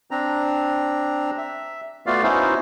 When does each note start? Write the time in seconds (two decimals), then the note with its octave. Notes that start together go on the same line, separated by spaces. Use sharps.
0.11 C4 D4 A#5
1.37 E5
2.06 A3 B3 F4 F#4 D5 F5
2.23 B3 C#4 D#4 E4 F#4 C5